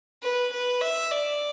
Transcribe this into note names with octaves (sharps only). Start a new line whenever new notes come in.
B4
B4
E5
D5